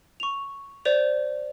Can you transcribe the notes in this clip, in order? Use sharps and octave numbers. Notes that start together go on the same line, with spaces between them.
C#6 F7
C5 D5 F7